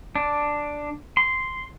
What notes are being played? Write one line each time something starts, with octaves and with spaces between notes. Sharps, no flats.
D4
C6